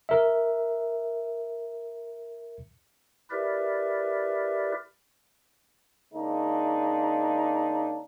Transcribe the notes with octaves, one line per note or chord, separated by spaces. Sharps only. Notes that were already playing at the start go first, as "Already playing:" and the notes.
A#4 E5
E4 G4 A#4 B4 D5 E5
C#3 G#3 A#3 D4 D#4